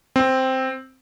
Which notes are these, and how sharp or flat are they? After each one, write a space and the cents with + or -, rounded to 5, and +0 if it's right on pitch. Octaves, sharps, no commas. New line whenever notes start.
C4 +0